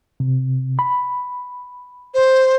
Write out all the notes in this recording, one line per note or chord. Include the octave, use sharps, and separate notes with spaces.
C3
B5
C5